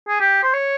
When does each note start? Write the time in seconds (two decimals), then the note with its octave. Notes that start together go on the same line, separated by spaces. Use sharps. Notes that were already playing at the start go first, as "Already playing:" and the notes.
0.08 G#4
0.20 G4
0.43 C5
0.54 C#5